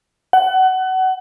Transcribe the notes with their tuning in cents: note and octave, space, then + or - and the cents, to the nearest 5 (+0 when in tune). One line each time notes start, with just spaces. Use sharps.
F#5 +25